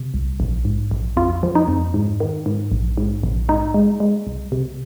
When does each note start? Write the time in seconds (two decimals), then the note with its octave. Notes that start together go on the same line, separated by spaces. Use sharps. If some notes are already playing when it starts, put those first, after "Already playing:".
Already playing: C3
0.14 C2
0.40 A#1
0.65 G#2
0.91 A#1
1.17 F2 F4
1.43 F3
1.55 D#4
1.68 F2
1.94 G#2
2.20 D#3
2.46 G#2
2.72 A#1
2.97 G#2
3.23 A#1
3.49 G#2 D#4
3.74 G#3
4.00 G#3
4.27 C2
4.52 C3